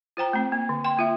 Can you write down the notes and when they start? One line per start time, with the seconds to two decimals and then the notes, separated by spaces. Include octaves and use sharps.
0.17 F4 C5 G5 A#5
0.33 A3 C4
0.52 A#3
0.69 D3
0.84 G5 C6
0.97 A#3 F4 E5